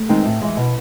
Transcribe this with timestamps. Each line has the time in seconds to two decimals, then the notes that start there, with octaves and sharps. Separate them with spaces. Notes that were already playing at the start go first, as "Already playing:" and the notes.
Already playing: A3
0.09 D#3 G#3 C4 D#4
0.25 A2
0.41 E3 G#3
0.57 B2